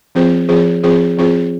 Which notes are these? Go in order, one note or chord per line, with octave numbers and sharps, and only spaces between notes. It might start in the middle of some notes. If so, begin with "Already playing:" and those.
F3 C4 F4 G#4 C5
F3 C4 F4 G#4 C5
F3 C4 F4 G#4 C5
F3 C4 F4 G#4 C5